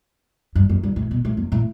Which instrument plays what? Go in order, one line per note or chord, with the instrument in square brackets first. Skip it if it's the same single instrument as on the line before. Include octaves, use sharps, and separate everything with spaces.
[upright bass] G2
F#2
G2
A2
B2
A2
F#2
A2